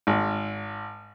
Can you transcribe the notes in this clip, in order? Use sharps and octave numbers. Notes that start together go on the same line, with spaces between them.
G#1